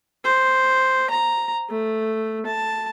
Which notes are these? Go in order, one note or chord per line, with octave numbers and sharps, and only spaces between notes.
C5
A#5
A3
A5